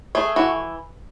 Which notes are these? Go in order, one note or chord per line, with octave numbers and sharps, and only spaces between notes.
A3 G#4
E3 F#4